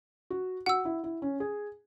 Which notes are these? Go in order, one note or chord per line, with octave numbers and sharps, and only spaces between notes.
F#4
F#4 F#5 E6
E4
E4
C#4
G#4